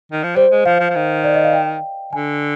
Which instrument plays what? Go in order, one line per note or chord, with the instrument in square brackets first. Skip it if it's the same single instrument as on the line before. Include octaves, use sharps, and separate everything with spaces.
[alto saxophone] D#3
F3
[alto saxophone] G3 [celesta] C5
[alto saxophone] G#3
[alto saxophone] F3 [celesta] F5
[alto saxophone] F3
F3
D#3
[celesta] D5
D#5
F5
G5
[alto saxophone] D3 [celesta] G#5